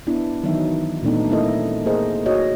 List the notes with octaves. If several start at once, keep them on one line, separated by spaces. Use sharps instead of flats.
B3 D4 E4
D#3 E3 F#3 B3 D#4 E5
A#2 F#3 A3 B3 D4 D#4
A3 C4 E4 A4 A#4 D#5
A#3 G#4 A#4 C5 D#5
F#4 C#5 D#5